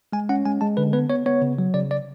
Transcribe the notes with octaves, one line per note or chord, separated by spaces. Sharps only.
G#3 G#5
C#4 F#5
G#3 G#5
G#3 A5
D3 B4
B3 B4
B3 C#5
B3 C#5
C#3
F#3
C#3 D5
D5